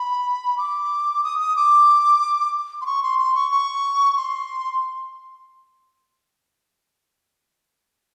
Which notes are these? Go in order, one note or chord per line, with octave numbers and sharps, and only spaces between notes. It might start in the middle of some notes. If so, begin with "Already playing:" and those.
Already playing: B5
D6
D#6
D#6
D6
C6
C#6
C6
C6
C#6
C#6
C6